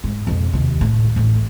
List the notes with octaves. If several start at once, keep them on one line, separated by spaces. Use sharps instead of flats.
G#2
B1 F2
D#2 C3
A2
A1 A2